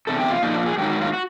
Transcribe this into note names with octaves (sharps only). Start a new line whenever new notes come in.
E2 C3 A4
G4
F4
A#2 F3 D#4
D4
G#4
G#2 D#3 F#3 G4
F#4
F4
F#4